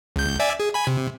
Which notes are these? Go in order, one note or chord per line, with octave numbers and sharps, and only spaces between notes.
C#2 G6
D5 E5 G#5
G#4
G#5 B5
C3